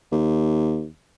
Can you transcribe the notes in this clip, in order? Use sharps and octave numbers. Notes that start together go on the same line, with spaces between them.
D#2